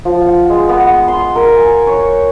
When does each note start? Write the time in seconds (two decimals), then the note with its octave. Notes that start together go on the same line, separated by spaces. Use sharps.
0.05 F3
0.26 F#5
0.50 G#3
0.69 B3
1.08 C6
1.35 A#4
1.56 G#5
1.87 C#5